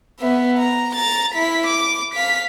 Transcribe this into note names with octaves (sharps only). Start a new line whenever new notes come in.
B3 E5
A#5
A#5 A6
E4 B6
D6
F5 B6